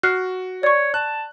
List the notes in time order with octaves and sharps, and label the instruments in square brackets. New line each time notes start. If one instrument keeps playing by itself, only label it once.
[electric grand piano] F#4 [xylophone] F6 F#6 C7
[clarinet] C#5 [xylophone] D5 C#6
[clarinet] A5 [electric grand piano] F#6